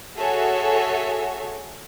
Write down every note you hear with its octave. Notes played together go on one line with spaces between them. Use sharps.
F#4 G#4 A4 C#5 E5